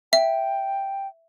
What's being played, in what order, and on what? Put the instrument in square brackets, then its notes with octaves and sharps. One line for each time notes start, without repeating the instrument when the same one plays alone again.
[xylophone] E5 [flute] G5